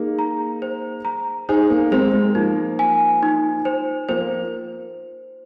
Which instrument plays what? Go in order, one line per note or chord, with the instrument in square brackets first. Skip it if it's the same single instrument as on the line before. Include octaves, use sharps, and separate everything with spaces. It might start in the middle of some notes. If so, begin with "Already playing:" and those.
Already playing: [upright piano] A#3 D#4 [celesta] G#4
[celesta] A#5
C5
A#5
[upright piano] D#4 G#4 [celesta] C5
[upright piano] A#3 D#4
[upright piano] G#3 C4 [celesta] C5
[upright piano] G#3
[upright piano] F3 A#3 [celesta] D#4
[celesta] G#5
D#4
C5
[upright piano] F3 A#3 [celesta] C5